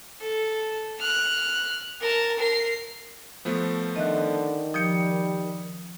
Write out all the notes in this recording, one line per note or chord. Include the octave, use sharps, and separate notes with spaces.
A4
F6 F#6
A#4 A5
A#4 C7
F3 A3 B3
D3 D#3 D#5 E5 F#6
F3 G3 D#6 G6 C#7